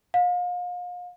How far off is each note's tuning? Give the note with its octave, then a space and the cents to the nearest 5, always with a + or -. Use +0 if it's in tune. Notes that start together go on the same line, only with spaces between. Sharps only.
F5 +35